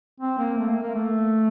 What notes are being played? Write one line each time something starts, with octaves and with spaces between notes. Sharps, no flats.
C4
A#3
A3
A#3
A#3
A3